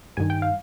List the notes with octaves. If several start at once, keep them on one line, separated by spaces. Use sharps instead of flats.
G2 D#3 G#5
G5
F5